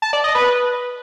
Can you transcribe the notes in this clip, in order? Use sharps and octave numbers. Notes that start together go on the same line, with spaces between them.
A5
D5
D#5
B4